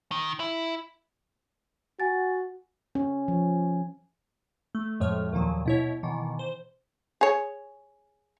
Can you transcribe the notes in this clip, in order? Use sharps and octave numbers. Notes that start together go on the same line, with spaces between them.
D#3
E4
F#4 F#5 G#5 A6
C#4
F3
A3
F2 A2 F3 G#3 C#5 F6
D#2 A#2 D#3 F3 F#3
B2 E4 C#5
B2 D#3 E3
C5
G#4 C#5